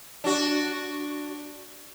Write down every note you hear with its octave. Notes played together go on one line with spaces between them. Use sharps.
D4 F#4